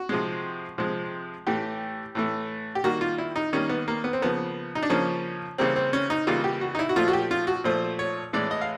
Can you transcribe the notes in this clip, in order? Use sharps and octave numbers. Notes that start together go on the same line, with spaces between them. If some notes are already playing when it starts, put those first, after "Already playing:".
Already playing: F#4
C3 F3 G#3
C3 F3 G#3
A2 E3 A3 G4
A2 E3 A3
G4
D#3 G3 A#3 F#4
F4
E4
D#4
D#3 G3 A#3 C#4
B3
A#3
B3
C4
C#3 F3 A#3 B3
D#4
D4
C#3 F3 A#3 C#4
C#3 E3 G3 A#3 C4
C4
C#4
D#4
C#3 E3 G3 A#3 F4
G4
F#4
D#4
E4
F#4
A#2 F3 A3 F4
F#4
G4
F4
F#4
A#2 F3 A3 C5
C#5
A2 E3 G#3 D5
D#5
F5